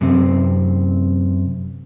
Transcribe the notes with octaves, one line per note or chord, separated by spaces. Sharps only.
F#2 C3 C4